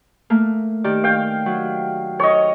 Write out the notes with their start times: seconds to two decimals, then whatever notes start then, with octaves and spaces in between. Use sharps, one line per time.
0.30 A3 A#3
0.84 D#3 G4 D5
1.04 F5 G5
1.46 F#3
2.19 A4 C#5 D#5